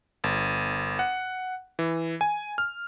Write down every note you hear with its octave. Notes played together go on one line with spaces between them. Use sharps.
G1
F#5
E3
G#5
F6